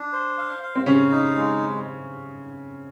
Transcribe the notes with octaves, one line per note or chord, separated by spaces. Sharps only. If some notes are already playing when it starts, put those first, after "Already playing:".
Already playing: D4
C5
F5
F5
C4
C#3 C#4 F5
D#4
G#3